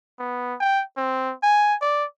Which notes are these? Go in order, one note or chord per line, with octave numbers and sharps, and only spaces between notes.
B3
G5
C4
G#5
D5